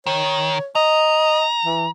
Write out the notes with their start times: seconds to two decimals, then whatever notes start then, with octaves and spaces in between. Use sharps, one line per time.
0.06 D#3 C#5
0.75 D#5 A#5
1.65 E3